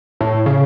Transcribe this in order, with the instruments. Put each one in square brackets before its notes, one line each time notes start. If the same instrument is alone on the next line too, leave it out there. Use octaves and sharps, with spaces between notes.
[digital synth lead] A2
C#3